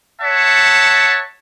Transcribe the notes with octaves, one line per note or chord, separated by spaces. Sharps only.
C#5 E5 F#5 A5